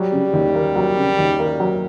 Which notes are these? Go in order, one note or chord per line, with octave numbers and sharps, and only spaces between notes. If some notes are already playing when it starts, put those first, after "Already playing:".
Already playing: F#3 G3
C#3
D#2
A#3
F#3
C#3
D#2
A#3
F#3